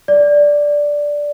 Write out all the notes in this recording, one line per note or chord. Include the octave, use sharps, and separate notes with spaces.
D5